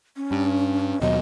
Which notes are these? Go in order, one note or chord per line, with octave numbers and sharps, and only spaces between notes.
C#4
G2
D#2 B2 F#3 D#5